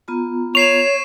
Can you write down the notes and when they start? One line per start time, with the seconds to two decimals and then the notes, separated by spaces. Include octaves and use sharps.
0.08 B3 F4 A#5
0.55 C#5 C#6 C7 E7 F7